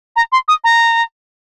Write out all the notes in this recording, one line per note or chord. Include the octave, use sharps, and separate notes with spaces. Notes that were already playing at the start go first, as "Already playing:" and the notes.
A#5
C6
D#6
A#5